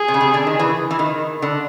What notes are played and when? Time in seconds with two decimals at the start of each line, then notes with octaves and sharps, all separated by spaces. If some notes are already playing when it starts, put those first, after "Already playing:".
Already playing: G#4
0.08 C3
0.14 C#3
0.21 C3
0.34 D3
0.47 D#3
0.59 E3
0.91 E3
0.99 D#3
1.42 D3